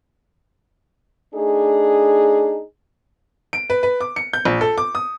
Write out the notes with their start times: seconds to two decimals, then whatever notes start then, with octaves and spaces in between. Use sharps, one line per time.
1.34 A3 D4 D#4 G#4
3.53 D7
3.70 B4
3.83 B4
4.01 D6
4.16 C#7
4.33 G6
4.45 A#1
4.61 A4
4.78 D6
4.95 D#6